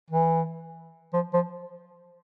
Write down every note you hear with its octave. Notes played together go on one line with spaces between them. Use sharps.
E3
F3
F3